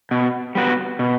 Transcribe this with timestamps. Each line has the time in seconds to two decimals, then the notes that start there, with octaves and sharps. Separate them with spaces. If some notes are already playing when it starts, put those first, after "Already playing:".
0.11 B2
0.55 G3 B3 F#4
0.99 B2